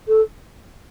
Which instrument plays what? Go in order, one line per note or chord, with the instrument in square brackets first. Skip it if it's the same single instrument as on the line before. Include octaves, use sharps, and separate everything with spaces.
[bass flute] A4